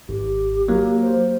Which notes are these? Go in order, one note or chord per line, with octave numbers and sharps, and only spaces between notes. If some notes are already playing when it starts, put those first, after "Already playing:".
G#1 G4
F#3 A#3
C5